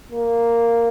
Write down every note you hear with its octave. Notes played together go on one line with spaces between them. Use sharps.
A#3